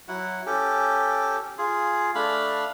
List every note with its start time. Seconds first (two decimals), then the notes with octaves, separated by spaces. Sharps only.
0.08 F#3 E4 F#5
0.46 C#4 G4 A4
1.58 F4 G#4
2.15 A3 D4 F5 B5